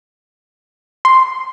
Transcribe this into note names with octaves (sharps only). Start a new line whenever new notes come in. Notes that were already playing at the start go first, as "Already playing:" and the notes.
C6